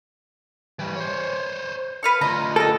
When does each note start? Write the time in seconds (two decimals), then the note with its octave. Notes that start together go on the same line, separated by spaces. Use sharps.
0.79 E3 G3
0.96 C5 C#5
2.03 B4 F5 C#6
2.21 D2 F4 D#5 A#5
2.56 A4 D#5 G5